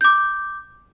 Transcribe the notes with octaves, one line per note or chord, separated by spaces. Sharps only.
D6 G6